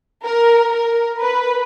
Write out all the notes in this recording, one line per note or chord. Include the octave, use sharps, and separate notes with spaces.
A#4
A#4
B4